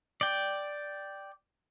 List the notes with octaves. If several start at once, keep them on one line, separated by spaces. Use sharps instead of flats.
D5 G5